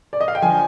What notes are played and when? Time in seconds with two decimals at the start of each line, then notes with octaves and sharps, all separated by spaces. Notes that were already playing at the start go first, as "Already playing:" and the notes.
0.13 D5
0.21 D#5
0.28 F5
0.35 G5
0.42 D3 F3 G#5